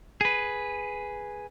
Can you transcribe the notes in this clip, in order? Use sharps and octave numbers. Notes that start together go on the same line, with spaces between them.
G#4 B4